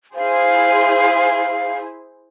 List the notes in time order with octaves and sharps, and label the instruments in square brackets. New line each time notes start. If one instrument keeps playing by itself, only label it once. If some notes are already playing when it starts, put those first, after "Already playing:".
[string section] E4 G#4 C5 [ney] F5